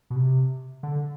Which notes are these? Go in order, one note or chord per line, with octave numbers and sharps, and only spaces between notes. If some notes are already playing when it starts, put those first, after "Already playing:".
B2
C3
D3